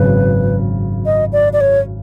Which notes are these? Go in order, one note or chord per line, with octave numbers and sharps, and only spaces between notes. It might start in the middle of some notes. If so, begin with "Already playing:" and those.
Already playing: G#1 F#2 C#3 B4
D#5
D5
D5
C#5